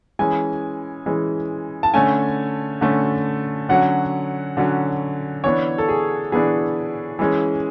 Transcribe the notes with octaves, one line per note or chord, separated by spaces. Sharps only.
E3 G#3 C#4 G#5
E3 G#3 C#4
A5
D3 A3 C#4 G#5
D3 A3 C#4
D3 F#3 C#4 F#5
D3 F#3 C#4
E3 B3 D4 C#5
A4
G#4
E3 B3 D4 G#4
E3 G#3 C#4